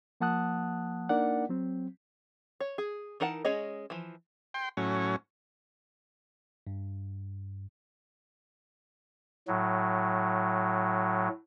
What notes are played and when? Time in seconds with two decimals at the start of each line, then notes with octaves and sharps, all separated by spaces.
0.21 F3 A#3 F#5 A5 D#6 F#6
1.09 A#3 D4 D#4 A#4 D5 F#5
1.49 F#3 C4
2.60 C#5
2.78 G#4
3.20 E3 D#4 A#4 F#5 A5
3.45 G#3 C#4 G#4 C#5 D#5
3.90 E3 F3
4.54 G5 C6
4.77 A2 F#3 C#4
6.67 G2
9.48 A2 F#3